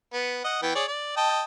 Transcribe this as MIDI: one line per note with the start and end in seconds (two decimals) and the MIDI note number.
0.13 0.41 59
0.44 0.59 75
0.44 0.59 78
0.62 0.71 52
0.62 0.71 59
0.62 0.71 79
0.75 0.85 68
0.75 0.85 73
0.75 0.85 74
0.88 1.16 74
1.17 1.42 75
1.17 1.42 79
1.17 1.42 81